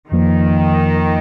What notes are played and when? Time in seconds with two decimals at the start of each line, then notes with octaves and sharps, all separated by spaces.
0.12 F2 D#3 F3 A#3